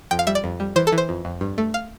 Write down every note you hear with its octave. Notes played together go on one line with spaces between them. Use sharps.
F2 G5
F5
G3 E5
D5
F2
G3
E3 C5
A4
E3
C5
F2
F2
G2
A3
F5